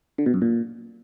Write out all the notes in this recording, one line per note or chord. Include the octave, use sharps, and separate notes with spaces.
D3
B2
F#2
A#2